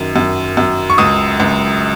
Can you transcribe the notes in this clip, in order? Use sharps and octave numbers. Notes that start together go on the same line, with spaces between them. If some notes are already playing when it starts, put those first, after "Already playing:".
Already playing: F#2 D#3
F#2
F#2
C#6
C#2 D#6
C#2